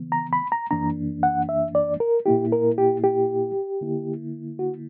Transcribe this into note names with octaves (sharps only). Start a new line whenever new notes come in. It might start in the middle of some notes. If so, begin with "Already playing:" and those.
Already playing: C#3 E3 B3
A#5
B5
A#5
F#2 E3 A#3 D4 A#5
F#5
E5
D5
A#4
A#2 A#3 E4 G4
A#4
G4
G4
D3 A#3 E4
F#4